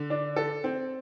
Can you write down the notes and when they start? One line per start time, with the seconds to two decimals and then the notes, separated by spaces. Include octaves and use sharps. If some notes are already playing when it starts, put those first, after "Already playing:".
Already playing: D3
0.10 D4
0.36 A4
0.64 C4